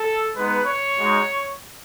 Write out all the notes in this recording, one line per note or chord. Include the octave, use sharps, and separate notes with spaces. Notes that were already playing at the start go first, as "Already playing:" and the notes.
Already playing: A4
G#3 B3 D#4 B4
C#5
G#3 D#4 F#4